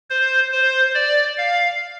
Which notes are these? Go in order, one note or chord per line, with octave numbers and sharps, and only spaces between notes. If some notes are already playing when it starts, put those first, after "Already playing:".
C5
C5
D5
F5